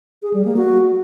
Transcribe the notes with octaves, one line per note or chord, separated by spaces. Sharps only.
G#4
G3
A#3
F#4